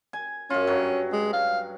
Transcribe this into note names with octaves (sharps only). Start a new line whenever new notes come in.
G#5
F#2 C#4 F4
G2 F#3
G#3
F5